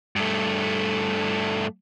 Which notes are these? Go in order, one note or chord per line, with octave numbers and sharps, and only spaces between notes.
G2 A3